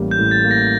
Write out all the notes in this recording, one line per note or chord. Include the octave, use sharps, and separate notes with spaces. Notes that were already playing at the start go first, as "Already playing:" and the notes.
Already playing: A1 A2 G3 A#3
G6
A2
A6
A#3
A#6